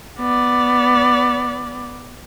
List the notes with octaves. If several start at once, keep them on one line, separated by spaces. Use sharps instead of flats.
B3 D5